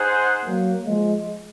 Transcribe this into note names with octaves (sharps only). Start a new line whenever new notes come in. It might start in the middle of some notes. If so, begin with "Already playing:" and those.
Already playing: D#4 G#4 C5 F#5
F#3 A#3
F3 G#3